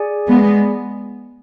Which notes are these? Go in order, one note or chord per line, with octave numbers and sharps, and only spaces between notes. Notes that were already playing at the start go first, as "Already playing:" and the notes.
Already playing: G#4 D5 G#5
G#3 B3